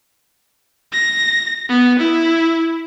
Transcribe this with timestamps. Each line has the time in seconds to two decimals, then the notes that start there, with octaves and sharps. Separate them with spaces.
0.92 A#6
1.69 B3
1.99 E4